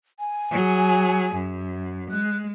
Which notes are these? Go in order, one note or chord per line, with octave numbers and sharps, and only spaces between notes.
G#5
F#3 G#4
F#2
G#3 F#6